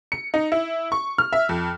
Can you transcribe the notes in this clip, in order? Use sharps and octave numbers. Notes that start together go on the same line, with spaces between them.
C#7
D#4
E4
C#6
F6
E5
F2